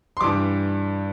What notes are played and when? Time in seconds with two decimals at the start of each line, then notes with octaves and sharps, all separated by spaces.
0.17 C6
0.21 G2 E3 G3 D6